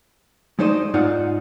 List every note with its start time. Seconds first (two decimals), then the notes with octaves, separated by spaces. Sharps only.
0.59 G#3 A3 D#4 C5 D5 D#5
0.94 G#2 D#4 F4 D5 F#5